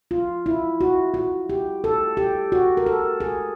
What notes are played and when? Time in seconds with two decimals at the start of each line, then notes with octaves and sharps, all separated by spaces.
0.11 F4
0.46 E4
0.81 F#4
1.14 F#4
1.50 G4
1.84 A4
2.17 G4
2.52 F#4
2.77 A#4
2.86 A4
3.20 G#4